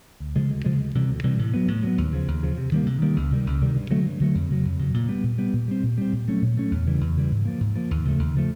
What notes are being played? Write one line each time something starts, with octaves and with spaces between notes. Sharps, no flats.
D2
C#3 F3 G#3
D2
C#3 F3 G#3
D2
C3 E3 G3
D2
C3 E3 G3
A2
F#3 B3
A2
F#3 B3
D#2
C#3 F3
D#2
C#3 F3
C3
D#3 G3 A#3
C3
D#3 G3 A#3
C#2
C3 D#3 G3
C#2
C3 D#3 G3
G2
D3 F#3 A3
G2
D3 F#3 A3
F2
C#3 F#3
F2
C#3 F#3
A#2
G3 B3
A#2
G3 B3
A#2
G3 C4
A#2
G3 C4
A#2
F#3 A3 C#4
A#2
F#3 A3 C#4
E2
C#3 E3 G3
E2
C#3 E3 G3
G#2
F3 A#3
G#2
F3 A#3
D#2
C#3 F3 A3
D#2
C#3 F3 A3